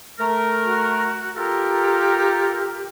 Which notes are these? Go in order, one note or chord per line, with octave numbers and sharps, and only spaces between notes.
A3 A#4
F#4
F4 G4 A4 A#4